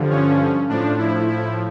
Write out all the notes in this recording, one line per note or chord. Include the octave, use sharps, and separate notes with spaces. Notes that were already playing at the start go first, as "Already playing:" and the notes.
Already playing: G2 D3 F3
C#4
A2 F3 D4
E4
E4